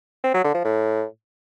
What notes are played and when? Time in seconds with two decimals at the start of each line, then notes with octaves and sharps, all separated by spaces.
0.24 C4
0.34 F#3
0.44 D3
0.54 F3
0.65 A2